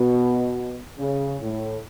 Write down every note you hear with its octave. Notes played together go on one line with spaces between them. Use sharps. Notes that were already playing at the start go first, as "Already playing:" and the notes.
Already playing: B2
C#3
A2